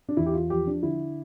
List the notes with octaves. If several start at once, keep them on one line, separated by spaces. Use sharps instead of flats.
D4
E2 E4
G4
F4
F3 G4
D4
D3 E4